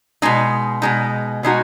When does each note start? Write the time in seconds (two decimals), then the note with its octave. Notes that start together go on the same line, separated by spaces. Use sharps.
0.22 B2 G#3 D#4
0.82 B2 G#3 D#4
1.43 B2 G#3 D#4 F#4